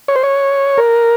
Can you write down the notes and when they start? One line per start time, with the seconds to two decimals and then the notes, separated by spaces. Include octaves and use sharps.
0.08 C#5
0.16 C5
0.23 C#5
0.78 A#4